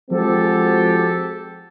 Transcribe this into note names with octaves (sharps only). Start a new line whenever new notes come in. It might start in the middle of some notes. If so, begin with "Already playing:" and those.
F3 G#3 C4 F#4 G4 A4